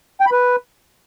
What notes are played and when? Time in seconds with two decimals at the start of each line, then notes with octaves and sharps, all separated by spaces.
0.21 G5
0.26 B5
0.32 B4